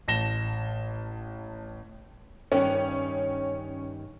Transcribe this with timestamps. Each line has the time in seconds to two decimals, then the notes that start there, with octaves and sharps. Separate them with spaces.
0.08 A1 A5 A#6 E7 G7
2.52 G2 D#3 C#4